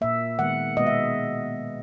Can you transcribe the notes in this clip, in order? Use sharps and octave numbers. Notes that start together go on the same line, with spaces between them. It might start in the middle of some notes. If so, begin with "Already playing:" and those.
A#2 A#3 E5
D#3 G#3 B3 F#5
B2 G#3 B3 D#5
E5